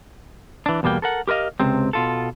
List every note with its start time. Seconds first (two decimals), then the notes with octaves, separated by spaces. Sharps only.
0.66 E3 D4
0.83 E2 B2 G3 A#3 G5
1.02 A4 A#4 F#5
1.28 G4 A#4 B4 D#5 F5
1.60 C#2 C3 C4
1.93 B2 F4 A4